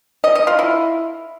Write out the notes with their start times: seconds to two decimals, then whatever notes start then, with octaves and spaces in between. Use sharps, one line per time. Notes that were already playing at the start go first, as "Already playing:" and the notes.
0.24 D#5
0.35 D#5
0.47 F4
0.59 E4